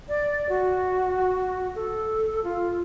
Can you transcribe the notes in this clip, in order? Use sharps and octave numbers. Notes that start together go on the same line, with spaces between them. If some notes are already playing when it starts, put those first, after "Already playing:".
D5
F#4
A4
F4